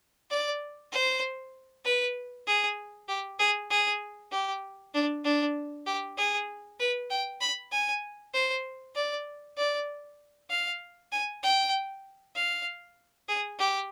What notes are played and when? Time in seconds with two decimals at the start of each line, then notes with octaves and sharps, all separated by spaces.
0.31 D5
0.93 C5
1.85 B4
2.47 G#4
3.09 G4
3.40 G#4
3.70 G#4
4.32 G4
4.94 D4
5.25 D4
5.87 G4
6.17 G#4
6.80 B4
7.10 G5
7.41 B5
7.72 G#5
8.34 C5
8.95 D5
9.57 D5
10.50 F5
11.12 G#5
11.43 G5
12.36 F5
13.29 G#4
13.59 G4